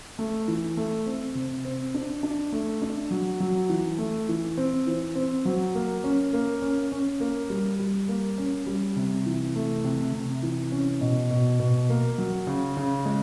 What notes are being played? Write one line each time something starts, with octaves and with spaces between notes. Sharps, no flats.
A3
E3
A3
C4
C3
C4
D4
D4
A3
D4
F#3
F#3
E3
A3
E3
C4
E3
C4
F#3
A#3
C#4
A#3
C#4
C#4
A#3
G3
G3
A#3
C#4
G3
C3
E3
A3
C3
C3
E3
C#4
B2
B2
B2
A#3
F#3
C#3
C#3
G#3